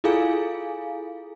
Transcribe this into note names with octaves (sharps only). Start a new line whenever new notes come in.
E4 F4 G#4 A4 F5 G#5